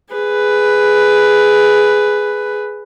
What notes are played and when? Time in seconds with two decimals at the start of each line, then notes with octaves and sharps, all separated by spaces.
0.14 G#4 B4